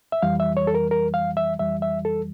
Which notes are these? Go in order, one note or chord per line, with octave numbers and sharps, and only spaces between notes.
E5
F2 E3 G3 F5
E5
C#5
A4
A#4
A#4
F5
E5
F2 E3 G3 E5
E5
A4